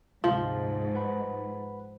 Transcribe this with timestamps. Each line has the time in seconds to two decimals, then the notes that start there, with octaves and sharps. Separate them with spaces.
0.24 D2 G#2 C3 F3
0.94 B4 F#5 B5